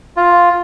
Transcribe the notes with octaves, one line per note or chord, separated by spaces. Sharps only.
F4